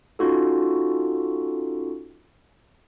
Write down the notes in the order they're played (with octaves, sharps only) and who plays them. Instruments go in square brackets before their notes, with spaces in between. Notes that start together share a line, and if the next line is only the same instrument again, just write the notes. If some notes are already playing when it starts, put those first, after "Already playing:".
[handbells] C#4 D#4 F4 F#4 A4